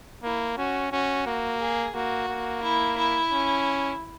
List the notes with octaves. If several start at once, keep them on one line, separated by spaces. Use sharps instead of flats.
A#3 E4
C#4 F#4
C#4 F#4
A#3
G#4
A#3 F#4
A#3
E4
E4
C#4